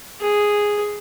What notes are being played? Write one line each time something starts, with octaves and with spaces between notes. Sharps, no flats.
G#4